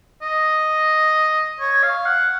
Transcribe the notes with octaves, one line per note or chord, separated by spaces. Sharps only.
D#5
C#5
F5
F#5